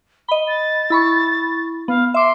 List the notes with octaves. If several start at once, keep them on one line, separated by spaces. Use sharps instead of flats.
D#5 B5 G7
A6
E4 B5 C#6
B3 F5
E5 C6 D6